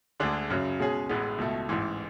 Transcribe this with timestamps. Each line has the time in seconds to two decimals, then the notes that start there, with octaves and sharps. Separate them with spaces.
0.20 D2 D3 G#3 D4 G#4
0.50 F#2 C#3 F#3
0.79 B2 G#3 C#4 G#4
1.09 A1 A2 G#3 B3
1.38 C#2 B2 A3
1.69 A1 G#2 E3